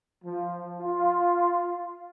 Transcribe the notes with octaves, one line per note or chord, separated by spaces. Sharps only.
F3
F4